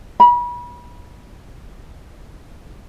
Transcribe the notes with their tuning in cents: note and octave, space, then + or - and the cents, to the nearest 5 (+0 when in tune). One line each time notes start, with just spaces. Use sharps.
B5 -30